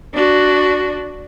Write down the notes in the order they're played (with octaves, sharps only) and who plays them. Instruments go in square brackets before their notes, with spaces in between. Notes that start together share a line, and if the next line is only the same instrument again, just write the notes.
[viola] D4 F#4